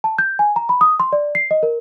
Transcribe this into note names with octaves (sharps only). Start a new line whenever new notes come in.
A5
G6
G#5
A#5
B5
D#6
C6
D5
C7
D#5
A#4